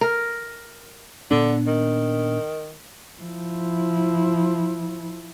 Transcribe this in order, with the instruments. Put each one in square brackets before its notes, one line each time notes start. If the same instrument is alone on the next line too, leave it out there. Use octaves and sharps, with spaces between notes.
[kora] A#4
[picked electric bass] A#2 B3 D4 [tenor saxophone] D3
[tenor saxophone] D#3
[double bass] F3 E4